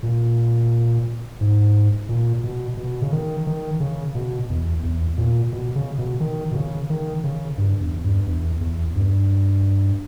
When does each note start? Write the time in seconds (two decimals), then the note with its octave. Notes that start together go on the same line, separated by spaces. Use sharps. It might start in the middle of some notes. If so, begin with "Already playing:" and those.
0.03 A#2
1.41 G#2
2.09 A#2
2.44 B2
2.77 B2
3.02 C#3
3.13 D#3
3.47 D#3
3.80 C#3
4.15 B2
4.50 E2
4.83 E2
5.18 A#2
5.52 B2
5.75 C#3
5.98 B2
6.20 D#3
6.51 B2
6.55 C#3
6.90 D#3
7.24 C#3
7.58 G2
7.81 E2
8.04 G2
8.27 E2
8.61 E2
8.95 G2